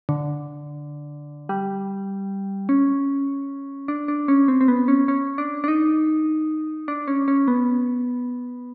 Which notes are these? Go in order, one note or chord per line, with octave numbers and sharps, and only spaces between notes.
D3
G3
C#4
D4
D4
C#4
C4
C4
B3
C#4
C#4
D4
D4
D#4
D4
C#4
C#4
B3